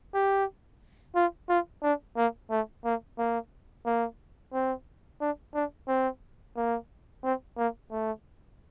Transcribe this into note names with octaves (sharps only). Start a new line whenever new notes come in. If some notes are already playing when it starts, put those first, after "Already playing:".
G4
F4
F4
D4
A#3
A3
A#3
A#3
A#3
C4
D4
D4
C4
A#3
C4
A#3
A3